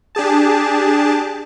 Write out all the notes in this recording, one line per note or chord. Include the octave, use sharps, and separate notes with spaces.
D4 G4 G#4 A5